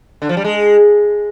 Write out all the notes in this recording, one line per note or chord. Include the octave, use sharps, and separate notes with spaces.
D3
F3
G3
G#3